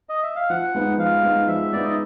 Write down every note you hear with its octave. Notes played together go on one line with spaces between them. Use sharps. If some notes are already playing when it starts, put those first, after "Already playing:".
D#5
E5
F5
F3 F#5
G#3 B3 D#4
F3 F5
G#3 B3 D#4
F3 E5
G#3 B3 D#4 D5
D#5